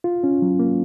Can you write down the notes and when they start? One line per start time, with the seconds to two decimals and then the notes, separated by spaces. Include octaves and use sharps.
0.04 F4
0.24 C#4
0.42 F#3
0.59 A#3